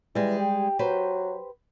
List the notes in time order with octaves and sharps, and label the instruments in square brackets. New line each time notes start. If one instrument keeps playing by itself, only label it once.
[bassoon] E3 [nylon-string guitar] G3 G#3
[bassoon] G4
[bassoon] F#3 [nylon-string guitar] G4 B4 C5